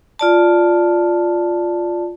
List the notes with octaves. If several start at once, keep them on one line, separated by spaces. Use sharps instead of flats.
F4 D5 A5